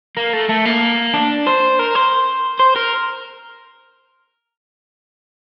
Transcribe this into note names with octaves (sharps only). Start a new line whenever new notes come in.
A#3
A3
A3
A#3
D4
C5
A#4
C5
C5
A#4